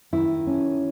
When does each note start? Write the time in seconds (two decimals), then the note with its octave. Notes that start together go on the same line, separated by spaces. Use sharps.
0.13 D#3 E4
0.47 C#4